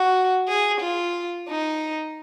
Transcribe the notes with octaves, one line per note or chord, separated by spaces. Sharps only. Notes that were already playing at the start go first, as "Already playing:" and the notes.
Already playing: F#4
G#4
F4
D#4